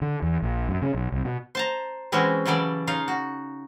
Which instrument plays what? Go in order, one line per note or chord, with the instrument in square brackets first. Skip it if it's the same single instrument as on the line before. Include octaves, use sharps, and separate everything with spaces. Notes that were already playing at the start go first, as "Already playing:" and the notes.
[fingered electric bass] D3
E2
A#1
F#2
C#3
B1
C2
B2
[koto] C5 A5 A#5
E3 G#3 C4 C#4 E4 F#4
C#3 E3 F#3 G3 A4 D5
C#3 D#4 F4 F5
F#4